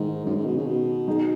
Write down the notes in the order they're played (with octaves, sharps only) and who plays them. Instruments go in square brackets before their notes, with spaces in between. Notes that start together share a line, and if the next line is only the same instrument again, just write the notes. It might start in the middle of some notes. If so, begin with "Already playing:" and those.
Already playing: [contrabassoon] G#2 [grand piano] D#3 G#3 D#4
[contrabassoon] F#2
G#2
B2
C#3
B2
[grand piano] F#3 D#4 G#4